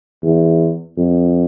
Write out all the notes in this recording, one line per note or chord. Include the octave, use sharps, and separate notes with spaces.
E2
F2